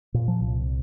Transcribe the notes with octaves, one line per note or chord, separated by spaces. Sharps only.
A#2
F3
C2